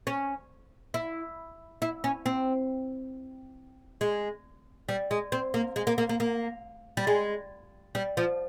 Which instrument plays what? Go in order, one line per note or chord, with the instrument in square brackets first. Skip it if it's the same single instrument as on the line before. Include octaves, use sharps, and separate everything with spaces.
[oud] C#4
E4
E4
C#4
C4
G#3
G3
G#3
C4
A#3
G#3
A#3
A#3
A#3
A#3
G3
G#3
G3
F3